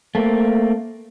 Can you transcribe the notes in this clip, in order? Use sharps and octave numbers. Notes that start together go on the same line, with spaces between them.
A3 A#3 C4